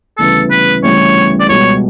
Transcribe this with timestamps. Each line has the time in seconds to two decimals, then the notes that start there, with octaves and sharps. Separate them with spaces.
0.18 D2 C#3 E3 G3 B3 A4
0.51 B4
0.83 D2 C#3 E3 G3 B3 C#5
1.40 D5
1.49 C#2 B2 G3 C#5